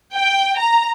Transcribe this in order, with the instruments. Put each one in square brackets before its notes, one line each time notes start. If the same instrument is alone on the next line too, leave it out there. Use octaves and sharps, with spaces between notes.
[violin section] G5
A#5